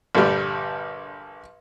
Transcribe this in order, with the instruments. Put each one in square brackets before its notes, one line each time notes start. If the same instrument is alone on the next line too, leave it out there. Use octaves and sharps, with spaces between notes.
[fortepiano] A#1 G2 D3 G3